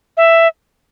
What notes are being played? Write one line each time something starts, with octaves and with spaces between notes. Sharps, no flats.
E5